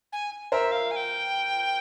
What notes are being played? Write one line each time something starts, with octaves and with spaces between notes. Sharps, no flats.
G#5
A#4 C5 E5
F5
G#5
G5